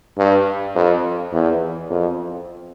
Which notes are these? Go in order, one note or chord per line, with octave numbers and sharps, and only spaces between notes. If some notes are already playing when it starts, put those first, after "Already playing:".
G2
F2
E2
F2